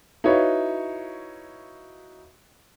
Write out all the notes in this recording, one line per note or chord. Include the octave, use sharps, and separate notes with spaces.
D#4 E4 F#4 B4 C#5 F5